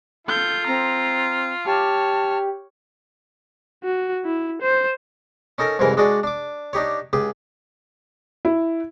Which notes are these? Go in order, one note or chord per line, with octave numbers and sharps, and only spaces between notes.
F4 A4 G6
C4 A#5
G4 C#5 A5 F6
F#4
E4
C5
C#4 D#4 A4 A#4
C2 F2 G#2 E3 A#4
G#3 D4 F#4 G#4 D5
D4 D6
D4 D#4 G4 C#5
C#2 G4 G#4
E4